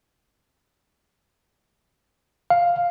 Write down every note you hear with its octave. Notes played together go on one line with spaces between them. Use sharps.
F5